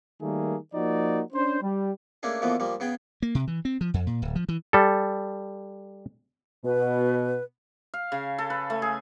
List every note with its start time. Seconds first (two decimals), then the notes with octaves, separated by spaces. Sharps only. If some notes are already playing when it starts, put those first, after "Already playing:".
0.21 D#3 G3 A3 A#3 G#4
0.74 F3 A#3 D#4 F#4 D5
1.33 C#4 D4 C5
1.62 G3
2.23 A3 A#3 C#4 D4 G#4
2.42 B2 D3 E3 F3 A#3 B3
2.60 F3 G3 A#3
2.80 C#3 B3 G#4 G5
3.22 A#3
3.35 C3
3.48 E3
3.65 C4
3.81 F3
3.94 F2
4.07 A#2
4.22 D1
4.35 F3
4.49 E3
4.73 G3 A4
6.65 B2 B4
7.94 F5
8.12 C#3
8.38 A4
8.50 B4
8.70 A3
8.82 G#4